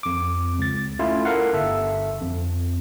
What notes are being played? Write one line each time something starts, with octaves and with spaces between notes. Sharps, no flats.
F2 D6
C#2 A6
A3 C#4 E4 F4
A4 A#4 F5 F#5
G1 A4 E5
F2